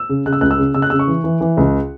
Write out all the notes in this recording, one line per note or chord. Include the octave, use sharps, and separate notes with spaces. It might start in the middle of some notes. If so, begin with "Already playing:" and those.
Already playing: E6
C#3
C#3 F#6
E6
C#2 F#6
E6
C#3
C#3 E6
F#6
C#3 E6
C#6
E3
E3
E3
C#2